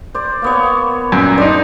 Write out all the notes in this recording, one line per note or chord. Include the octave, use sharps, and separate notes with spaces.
C5 D5
A#3 B3 C#5
F#2 A#2
D4 D#4 C5 D5 C6